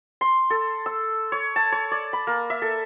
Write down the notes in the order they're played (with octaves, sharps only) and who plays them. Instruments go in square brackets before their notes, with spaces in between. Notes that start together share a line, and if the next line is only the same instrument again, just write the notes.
[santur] C6
A4
E6
C#5
A5
C#5
D5
B5
A#3
E5
A4